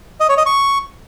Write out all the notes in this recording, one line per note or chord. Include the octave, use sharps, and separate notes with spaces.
D#5
C#5
D#5
C#6